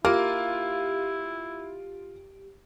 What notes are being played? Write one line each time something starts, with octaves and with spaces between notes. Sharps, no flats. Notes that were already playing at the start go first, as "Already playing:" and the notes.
A#3 E4 F4 G4